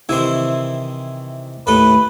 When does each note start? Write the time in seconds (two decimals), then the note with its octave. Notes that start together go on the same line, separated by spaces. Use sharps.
0.09 C3 D#3 E3 E4 C5
1.67 D#2 A2 A4 B4